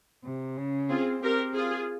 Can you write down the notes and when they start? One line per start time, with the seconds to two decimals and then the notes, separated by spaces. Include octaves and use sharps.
0.24 C3
0.57 C#3
0.89 C4 F4 G#4
1.22 C4 G4 A#4
1.55 F4 G#4